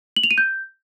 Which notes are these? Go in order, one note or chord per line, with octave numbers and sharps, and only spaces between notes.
F#7
F7
D#7
G6